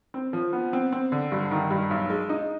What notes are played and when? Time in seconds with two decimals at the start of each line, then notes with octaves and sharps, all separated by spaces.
0.14 C4
0.33 F3
0.53 B3
0.73 C4
0.92 C4
1.12 D3
1.32 G2
1.51 D#3
1.71 G2
1.91 B1
2.10 G#3
2.29 D#4